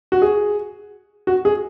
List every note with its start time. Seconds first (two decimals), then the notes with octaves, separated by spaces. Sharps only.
0.12 F#4
0.22 G#4
1.27 F#4
1.45 G#4